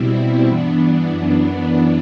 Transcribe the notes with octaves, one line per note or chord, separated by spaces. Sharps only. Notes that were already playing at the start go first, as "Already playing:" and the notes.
Already playing: B2 G3 C4 E4
G2 E3 B3 D4
F#2 E3 B3 D4